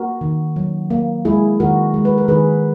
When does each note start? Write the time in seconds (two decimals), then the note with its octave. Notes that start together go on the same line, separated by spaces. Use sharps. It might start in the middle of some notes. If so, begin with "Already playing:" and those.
Already playing: A#3 F#4 A#4
0.21 D#3
0.56 F#3
0.90 A#3
1.25 G#3 E4 G#4
1.60 D#3 F#4 A#4
1.94 G#3
2.05 B4
2.18 A#4
2.28 D#3 G#4 B4